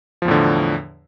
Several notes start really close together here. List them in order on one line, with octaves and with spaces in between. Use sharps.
F3 E2 A2 D3